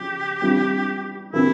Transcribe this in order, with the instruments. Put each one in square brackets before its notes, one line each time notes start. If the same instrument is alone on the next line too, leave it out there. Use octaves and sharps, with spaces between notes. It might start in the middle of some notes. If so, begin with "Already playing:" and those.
Already playing: [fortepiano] C#3 F3 C#4 [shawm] G4
[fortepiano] E3 G3 C4 F4
[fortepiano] C3 E3 A#3 [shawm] E4